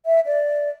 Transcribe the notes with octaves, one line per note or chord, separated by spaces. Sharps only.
E5
D5